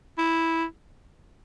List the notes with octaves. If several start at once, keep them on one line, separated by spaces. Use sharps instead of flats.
E4